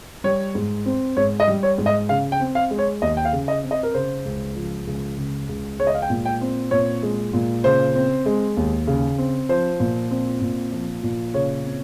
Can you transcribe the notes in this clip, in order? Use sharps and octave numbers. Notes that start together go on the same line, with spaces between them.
G3 C#5
G#2
C4
G#2 C#5
D#5
G3
C#5
G#2
D#5
C#3 F5
G5
C4
F5
G#3
C#5
D#2 D#5
G5
F5
C#3
D#5
C4
D#5
A#4
C#3 C5
C#2
F3
C#2
C#3
C#2
G#3 C#5
D#5
F5
G5
A#2
G5
C4
A#2 C#5
G#3
A#2
C#3 C5
C4
G#3
D#2
C#3
C4
F3 C5
A#2
C4
A#2
F3
A#2
C#3 C#5
C4